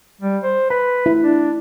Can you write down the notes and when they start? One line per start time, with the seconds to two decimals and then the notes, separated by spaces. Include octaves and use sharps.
0.21 G3
0.44 C5
0.70 B4 B5
1.06 E4
1.23 D4